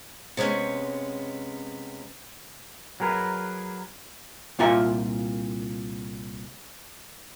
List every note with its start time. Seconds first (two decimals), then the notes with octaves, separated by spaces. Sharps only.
0.37 C3 G#3 B3 C#4
3.00 F#3 G#4 A#4 B4
4.59 C2 A#2 F4 E5 A#5